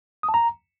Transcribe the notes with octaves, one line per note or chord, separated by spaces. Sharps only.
D#6
A5
A#5